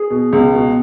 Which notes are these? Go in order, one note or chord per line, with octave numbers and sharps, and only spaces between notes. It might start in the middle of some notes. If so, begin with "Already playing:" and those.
Already playing: G#4
B2
C#2
B2